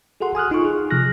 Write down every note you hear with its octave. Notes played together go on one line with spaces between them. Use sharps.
F#4 G#4 A4 F#5 C6
G#5 D#6 F6 F#6
D#4 F4 C6 C#6
G#4
C3 F3 F6 F#6 A#6